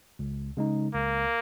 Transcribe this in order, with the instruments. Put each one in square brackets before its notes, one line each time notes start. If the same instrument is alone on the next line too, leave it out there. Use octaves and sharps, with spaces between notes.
[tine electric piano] C#2
C#3 G#3 D#4
[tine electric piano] C#2 [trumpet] A#3